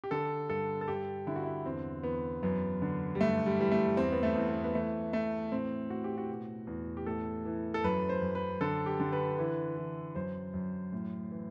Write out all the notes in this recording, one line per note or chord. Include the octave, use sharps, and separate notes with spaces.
G4
D3 A4
G2 A4
A4
G2 G4
D3 E4
F#4
E4
E2 C4
E2 B3
F#2 B3
D3
G3
G2 A3
G3
E3 G3
A3
E2 C4
B3
A3
E2
B3
B3
E3 A3
E3 A3
A2 C4
A2 F#4
G4
F#4
B2
E2
G4
A2 A4
E3
A4
F#2 B4
C5
F#2
B4
D3 A4
G4
D3
B4
E3
E3
F#2 C5
F#2
A2
E3